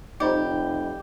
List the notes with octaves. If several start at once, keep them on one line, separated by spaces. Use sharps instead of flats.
F1 D#4 G4 C5 D5 D#5 A#5 B5